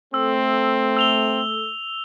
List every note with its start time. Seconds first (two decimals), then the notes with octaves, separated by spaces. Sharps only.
0.14 A3 C4 E6
0.97 E6 F7 G7